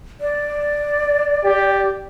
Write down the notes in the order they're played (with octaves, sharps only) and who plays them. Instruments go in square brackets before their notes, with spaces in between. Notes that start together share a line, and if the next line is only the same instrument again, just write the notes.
[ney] D5
[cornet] G4